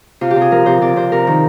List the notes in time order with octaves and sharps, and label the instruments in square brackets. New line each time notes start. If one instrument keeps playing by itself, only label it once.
[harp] C3 F4
G4
C3 G#4
F3 A#4
C3 C5
C3 D5
C3 C5
C3 A#4
D#3